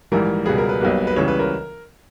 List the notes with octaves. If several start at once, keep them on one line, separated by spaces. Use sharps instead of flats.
A#1 G#2 E3 G3 A#3 A#4
C#2 B2 G3 B3 G#4
A#4
B4
B1 B2 G3 A#3 B4
B4
C#2 C#3 E3 G3 C#5
B4
A#4